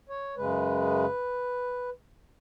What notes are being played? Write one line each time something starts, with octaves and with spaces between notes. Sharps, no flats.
C#5
F#2 C#3 G#3 B4